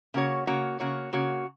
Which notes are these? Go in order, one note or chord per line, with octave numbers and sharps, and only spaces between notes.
C#3 A#3 F#4 C#5
C#3 A#3 F#4 C#5
C#3 A#3 F#4 C#5
C#3 A#3 F#4 C#5